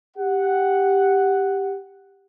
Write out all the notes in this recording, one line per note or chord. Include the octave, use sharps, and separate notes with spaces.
G4 F#5